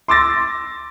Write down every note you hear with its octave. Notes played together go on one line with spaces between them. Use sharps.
C6 D6 E6 A6 A#6